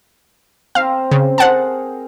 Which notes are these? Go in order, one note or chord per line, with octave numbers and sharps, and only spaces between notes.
C4 C5 F5 A#5
C#3
G#4 A#4 C5 F#5 A5